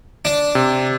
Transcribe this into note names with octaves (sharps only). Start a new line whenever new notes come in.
D4
C3